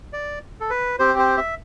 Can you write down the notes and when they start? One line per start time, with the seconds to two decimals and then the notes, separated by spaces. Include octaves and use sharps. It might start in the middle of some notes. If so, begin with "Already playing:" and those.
0.13 D5
0.60 A4
0.70 B4
0.99 C4 G4 C5
1.19 C5
1.37 E5